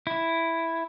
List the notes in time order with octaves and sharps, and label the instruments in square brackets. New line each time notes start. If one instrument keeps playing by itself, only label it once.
[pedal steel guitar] E4